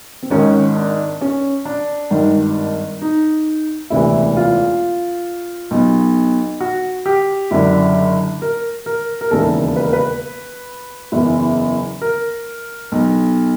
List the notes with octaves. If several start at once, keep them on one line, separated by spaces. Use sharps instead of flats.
C4
G#1 G#2 D#3 C#4
D4
C#4
D4
G#1 G2 D#3
D#4
E1 D2 C3 E3 E4
F4
B1 B2
F#4
G4
F#1 F#2 D3
A#4
A#4
A#4
E1 D#2 C#3 E3 A4
B4
A#4
B4
F#1 E2 C#3 E3
A#4
B1 B2